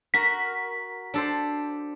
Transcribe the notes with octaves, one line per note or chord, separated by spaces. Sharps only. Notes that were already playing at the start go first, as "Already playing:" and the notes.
F#4 A#4 B6
D4 A4 C5